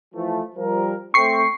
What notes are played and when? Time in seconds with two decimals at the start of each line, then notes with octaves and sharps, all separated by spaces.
0.14 E3 F3 A3
0.56 F3 G3 A#4
1.14 A3 C4 C#6 C7